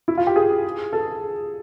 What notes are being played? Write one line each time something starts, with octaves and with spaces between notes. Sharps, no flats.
E4
F4
G4
G#4
A4